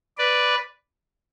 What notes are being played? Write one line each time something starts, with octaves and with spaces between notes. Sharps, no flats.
B4 D5